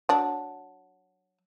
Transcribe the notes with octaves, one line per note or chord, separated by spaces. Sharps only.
F#3 D4